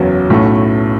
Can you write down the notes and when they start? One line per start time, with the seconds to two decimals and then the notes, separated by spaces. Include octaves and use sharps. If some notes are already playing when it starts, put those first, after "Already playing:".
Already playing: F#1 E2 C#3 F#3 C#4
0.30 B1 A2 A3 C#4 F#4